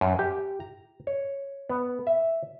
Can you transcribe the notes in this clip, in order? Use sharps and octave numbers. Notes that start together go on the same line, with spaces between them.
F#2
G4
A#5
C#5
B3
E5